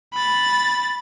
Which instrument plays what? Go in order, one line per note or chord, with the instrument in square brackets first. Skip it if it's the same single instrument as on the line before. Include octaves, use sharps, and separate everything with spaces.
[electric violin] B5 A6